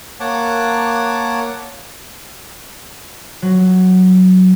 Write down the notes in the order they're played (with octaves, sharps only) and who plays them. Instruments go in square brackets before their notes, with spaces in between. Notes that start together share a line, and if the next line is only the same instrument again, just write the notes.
[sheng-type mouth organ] A#3 C#5 F#5 A5 D6
[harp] F#3